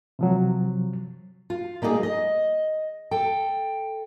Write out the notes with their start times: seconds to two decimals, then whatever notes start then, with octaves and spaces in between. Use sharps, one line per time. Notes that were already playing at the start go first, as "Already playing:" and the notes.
0.19 C3 F3 F#3
1.50 F4
1.82 G3 A#3 D#4 F#4 G#4
2.03 D#5
3.11 A4 G5